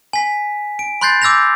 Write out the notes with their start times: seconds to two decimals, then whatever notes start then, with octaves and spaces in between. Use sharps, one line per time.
0.13 G#5 B6
0.79 D7
1.01 B5 C6 F#6 G6 A6 C7
1.22 D6 E6 G6 A#6 F7